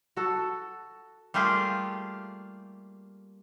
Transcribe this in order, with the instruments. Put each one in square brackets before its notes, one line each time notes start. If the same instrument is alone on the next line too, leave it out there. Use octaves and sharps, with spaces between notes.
[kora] F#4 A4
[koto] G3 A3 A#3 F4 G4 G#4